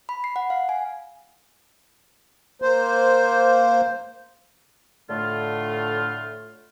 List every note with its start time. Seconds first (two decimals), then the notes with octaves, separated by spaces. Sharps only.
0.09 B5
0.24 C7
0.36 F#5
0.50 F5
0.69 G#5
2.62 A#3 C5
5.09 A2 D3 A3 F4